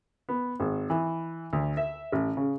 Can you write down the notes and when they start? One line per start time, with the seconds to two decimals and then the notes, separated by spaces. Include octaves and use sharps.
0.29 B3
0.60 G#1
0.90 E3
1.53 D2
1.77 E5
2.12 A1
2.37 C#3